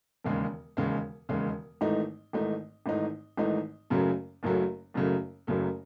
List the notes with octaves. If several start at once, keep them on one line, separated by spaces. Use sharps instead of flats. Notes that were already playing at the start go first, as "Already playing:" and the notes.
E1 D#2 C#3 G#3
E1 D#2 C#3 G#3
E1 D#2 C#3 G#3
G#1 G#2 E3 A3 D#4
G#1 G#2 E3 A3 D#4
G#1 G#2 E3 A3 D#4
G#1 G#2 E3 A3 D#4
F#1 F#2 C#3 F#3 A3
F#1 F#2 C#3 F#3 A3
F#1 F#2 C#3 F#3 A3
F#1 F#2 C#3 F#3 A3